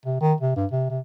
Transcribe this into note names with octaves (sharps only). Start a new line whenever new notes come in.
C3
D#3
C3
G2
C3
C3